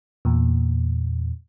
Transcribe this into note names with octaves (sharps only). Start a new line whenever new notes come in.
E2 A#2